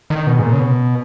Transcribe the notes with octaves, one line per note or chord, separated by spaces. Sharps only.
D#3
B2
G#2
A#2
C#3
B2